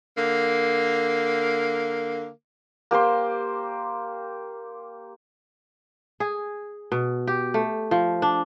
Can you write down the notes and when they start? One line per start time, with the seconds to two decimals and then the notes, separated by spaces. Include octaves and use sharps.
0.17 D3 A#3
2.91 A#3 G4 C5 C6
6.20 G#4
6.92 B2
7.27 G4
7.54 A3
7.91 F3
8.22 D4